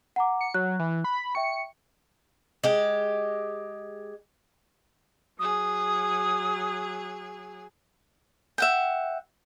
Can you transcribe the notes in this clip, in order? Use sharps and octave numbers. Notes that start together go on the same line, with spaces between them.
F#5 A#5 D6
C#7
F#3 F#6
E3
B5
E5 G5 C#6 C#7
G#3 G4
F#3 G#4 D#6
E5 F#5 G5